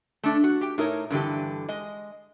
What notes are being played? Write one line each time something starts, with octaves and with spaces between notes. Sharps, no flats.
A3 D4
F#4
G4 G5
A2 D#4 A#4 C#5
G2 D3 E3 G4
G#3 D#5